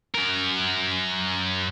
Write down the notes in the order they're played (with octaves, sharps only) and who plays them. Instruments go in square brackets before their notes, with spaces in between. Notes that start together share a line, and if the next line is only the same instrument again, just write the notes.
[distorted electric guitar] F#2 A#4